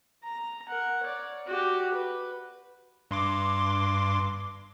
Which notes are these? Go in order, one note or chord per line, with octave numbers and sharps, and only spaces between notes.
A#5
A#4 F#5
C#5 D5
F#4 G4
B4
G2 C6 D6